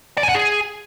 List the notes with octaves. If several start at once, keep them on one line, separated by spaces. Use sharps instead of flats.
D5
G#5
F#5
G#4